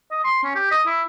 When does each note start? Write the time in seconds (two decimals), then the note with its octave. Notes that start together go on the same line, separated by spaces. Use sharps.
0.11 D#5
0.24 C6
0.43 C#4
0.55 G4
0.71 D#5
0.86 E4